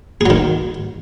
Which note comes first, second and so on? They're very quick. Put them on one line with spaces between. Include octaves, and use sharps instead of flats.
G#4 F#3 D#3